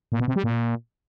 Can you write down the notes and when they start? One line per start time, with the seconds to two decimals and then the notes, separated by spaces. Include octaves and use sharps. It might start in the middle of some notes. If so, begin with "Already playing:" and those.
0.12 A#2
0.20 B2
0.28 C3
0.36 G3
0.44 A#2